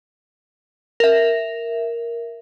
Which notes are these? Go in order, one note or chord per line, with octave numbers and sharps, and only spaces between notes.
A#4 E5